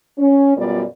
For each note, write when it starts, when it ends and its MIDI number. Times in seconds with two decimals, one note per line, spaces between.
0.18 0.56 61
0.56 0.82 42
0.56 0.82 47
0.56 0.82 55
0.56 0.82 59
0.56 0.82 65
0.56 0.82 74